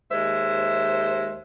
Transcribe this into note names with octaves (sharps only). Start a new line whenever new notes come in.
D#2 G#3 C5 E5